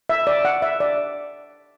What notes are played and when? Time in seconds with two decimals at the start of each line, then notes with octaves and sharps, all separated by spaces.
0.09 E5
0.27 D5
0.45 F#5
0.62 E5
0.80 D5